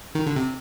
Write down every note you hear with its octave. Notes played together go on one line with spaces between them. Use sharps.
D#3
D3
C3